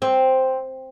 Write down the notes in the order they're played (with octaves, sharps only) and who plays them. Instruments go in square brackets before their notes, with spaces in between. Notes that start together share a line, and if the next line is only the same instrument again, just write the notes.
[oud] C4